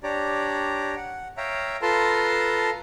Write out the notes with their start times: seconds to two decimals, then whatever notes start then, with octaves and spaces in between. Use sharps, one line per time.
0.03 D4 G4 C#5 D5 A#5
0.97 F#5
1.37 C#5 E5 F5 G5 A#5
1.82 F4 A4 B4 A5 A#5 C6